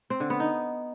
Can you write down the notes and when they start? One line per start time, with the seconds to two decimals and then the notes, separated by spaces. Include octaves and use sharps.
0.10 C4
0.20 D3
0.30 B3
0.40 D#4